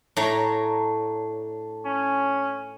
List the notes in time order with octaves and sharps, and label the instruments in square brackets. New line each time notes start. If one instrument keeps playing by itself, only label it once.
[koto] A2 [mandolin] D4 C#5 A#5
[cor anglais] C#4